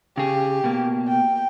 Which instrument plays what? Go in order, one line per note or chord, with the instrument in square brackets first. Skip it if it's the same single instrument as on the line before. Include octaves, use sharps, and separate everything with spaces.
[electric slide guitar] C#3 G#4 [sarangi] G4
[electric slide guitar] B2 A#3
[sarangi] G5